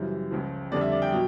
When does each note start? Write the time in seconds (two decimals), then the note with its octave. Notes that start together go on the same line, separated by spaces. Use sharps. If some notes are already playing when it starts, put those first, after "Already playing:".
Already playing: F#2 C#3 E3 G3 C5
0.31 C#2 C#3 F3
0.72 F2 D3 G3 D5
0.81 E5
0.92 D5
1.02 G5
1.12 B2 F#3